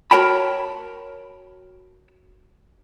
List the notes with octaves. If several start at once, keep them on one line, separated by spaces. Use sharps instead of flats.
F#4 A#4 C#5 G5 A5 B5